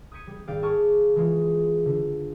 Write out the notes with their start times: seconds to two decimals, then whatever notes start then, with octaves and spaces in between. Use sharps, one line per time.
0.12 D#6 G6 G#6 B6 C#7 D#7
0.27 G3
0.47 G#1 G3 D5 F5 G5
0.62 G#4 A5 C#6 D6 F6
1.16 E3 G#3 F4
1.86 D3